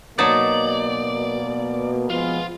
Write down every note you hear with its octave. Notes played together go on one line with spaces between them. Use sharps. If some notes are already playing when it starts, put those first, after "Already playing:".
B2 F#3 A#3 D#4 D5 A5
F3 G#3 B3 F4